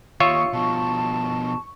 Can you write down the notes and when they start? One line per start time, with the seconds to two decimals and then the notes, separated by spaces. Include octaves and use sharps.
0.20 D#2 F4 C#5 E5 C#6 D#6
0.53 B2 F3 A5